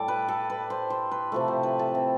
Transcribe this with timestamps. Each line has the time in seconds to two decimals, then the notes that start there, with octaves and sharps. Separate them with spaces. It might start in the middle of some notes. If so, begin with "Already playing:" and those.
Already playing: A2 G3 A4 D5
0.08 B4
0.28 A4
0.50 B4
0.70 C5
0.90 C5
1.11 B4
1.32 C3 F3 A3
1.48 C5
1.63 B4
1.79 A4
1.95 C4